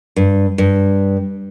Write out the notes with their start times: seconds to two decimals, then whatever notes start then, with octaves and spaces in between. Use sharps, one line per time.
0.16 G2
0.58 G2